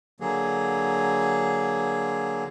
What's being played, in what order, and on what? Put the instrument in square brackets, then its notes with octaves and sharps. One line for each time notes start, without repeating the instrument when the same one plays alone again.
[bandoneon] D3 F#3 A#3 G#4